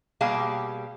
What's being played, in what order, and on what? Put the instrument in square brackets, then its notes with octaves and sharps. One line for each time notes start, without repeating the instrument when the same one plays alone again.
[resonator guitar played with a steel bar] B2 G3 A#3 G4 G#4 F5